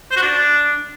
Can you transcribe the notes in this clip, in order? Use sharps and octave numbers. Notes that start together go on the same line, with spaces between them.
C5
F#4
D4